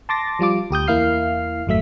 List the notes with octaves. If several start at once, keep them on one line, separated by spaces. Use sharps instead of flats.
A5 C6 D6 A6 A#6
F3 G3 F4 D6
D2 G4 D#6 G6
E2 A#3 E4 F5 F6 C7
G#1 F2 F#3 A3 E5 B6